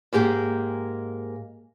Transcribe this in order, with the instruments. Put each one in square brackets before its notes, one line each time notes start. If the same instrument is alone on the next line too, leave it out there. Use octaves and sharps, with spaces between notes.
[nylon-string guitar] G#2 A#3 G4 G#4